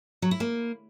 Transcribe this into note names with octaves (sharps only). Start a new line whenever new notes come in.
F#3
E4
A#3